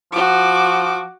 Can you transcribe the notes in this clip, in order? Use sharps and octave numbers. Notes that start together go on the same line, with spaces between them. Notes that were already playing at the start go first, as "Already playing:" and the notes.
F3 F#4 D6